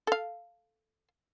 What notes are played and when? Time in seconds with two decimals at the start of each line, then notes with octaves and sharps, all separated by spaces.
0.07 A4 F5